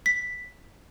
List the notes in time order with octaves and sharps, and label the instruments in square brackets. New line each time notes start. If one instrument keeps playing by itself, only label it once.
[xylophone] B6